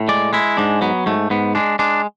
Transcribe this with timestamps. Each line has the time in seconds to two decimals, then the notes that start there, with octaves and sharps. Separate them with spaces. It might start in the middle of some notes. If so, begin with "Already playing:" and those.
Already playing: A2
0.08 G#3 D5
0.33 G#3 E4
0.57 G#2 D4
0.81 F#3 B3
1.06 G#2 A3
1.30 G#2 B3
1.55 G#3 D4
1.79 G#3 D4